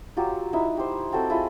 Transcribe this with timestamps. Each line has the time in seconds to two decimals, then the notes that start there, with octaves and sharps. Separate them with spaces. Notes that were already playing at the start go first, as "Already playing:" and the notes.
0.17 F#3 F4 G4
0.53 D#4 E4 E5 F#5
0.77 G4 C5
1.12 C4 F#4 A4 G5
1.30 E4 F4 G#4 D#5